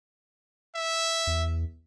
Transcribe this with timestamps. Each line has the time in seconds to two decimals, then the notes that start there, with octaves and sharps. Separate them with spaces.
0.75 E5
1.27 E2